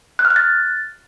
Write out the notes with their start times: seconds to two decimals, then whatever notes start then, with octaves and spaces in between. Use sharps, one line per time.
0.19 F#6
0.25 F6
0.30 F#6
0.36 A6